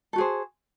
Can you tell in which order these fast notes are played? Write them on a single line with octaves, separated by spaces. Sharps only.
A4 F#4 G#4 C5